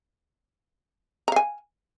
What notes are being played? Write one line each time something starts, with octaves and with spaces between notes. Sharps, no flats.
F5 G#5 A#5